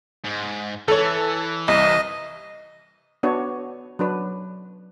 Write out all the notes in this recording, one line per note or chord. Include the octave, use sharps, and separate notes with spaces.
G#2
E3 A4 C#5
C2 D#5
B3 D4 F#4 C#5
F#3 D4 B4